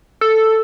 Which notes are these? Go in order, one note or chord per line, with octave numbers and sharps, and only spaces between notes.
A4